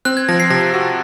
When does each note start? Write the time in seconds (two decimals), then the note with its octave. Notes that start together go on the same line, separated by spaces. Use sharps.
0.05 C4 F#6
0.17 G#6
0.29 F3 A#6
0.40 C7
0.50 C3 A#6
0.74 F#4